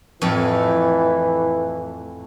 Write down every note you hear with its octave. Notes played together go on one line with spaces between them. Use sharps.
F2 A2 E3